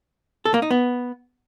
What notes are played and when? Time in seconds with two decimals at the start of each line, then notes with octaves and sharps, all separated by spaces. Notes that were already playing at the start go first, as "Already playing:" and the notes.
0.45 A4
0.54 A#3
0.62 D#4
0.71 B3